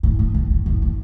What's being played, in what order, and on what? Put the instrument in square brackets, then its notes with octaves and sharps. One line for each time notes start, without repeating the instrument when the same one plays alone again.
[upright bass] A2
A2
A2
A2
A2
A2